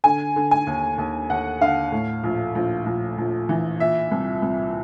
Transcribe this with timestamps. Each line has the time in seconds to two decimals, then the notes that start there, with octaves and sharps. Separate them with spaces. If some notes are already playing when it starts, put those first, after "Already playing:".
0.04 D3 G#5
0.36 D3
0.51 G#5
0.67 D#2
0.98 D#2
1.30 D#2 F#5
1.61 D3 F5
1.92 A2
2.23 A#1
2.55 A#1
2.86 A#1
3.18 A#1
3.49 E3
3.80 A#2 E5
4.11 C2
4.42 C2